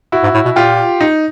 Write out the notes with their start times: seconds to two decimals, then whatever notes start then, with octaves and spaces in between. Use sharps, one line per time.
0.12 E4 F#4
0.23 G#2
0.34 A2
0.45 B2
0.56 A#2 F4 G4
1.01 D#4